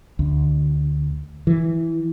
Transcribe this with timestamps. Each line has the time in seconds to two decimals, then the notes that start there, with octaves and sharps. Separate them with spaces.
0.19 D2
1.47 E3